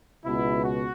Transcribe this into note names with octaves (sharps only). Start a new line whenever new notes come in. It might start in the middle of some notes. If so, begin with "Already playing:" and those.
C#2 B2 E4
F#4